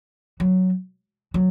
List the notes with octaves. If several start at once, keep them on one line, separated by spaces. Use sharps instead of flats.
F#3
F#3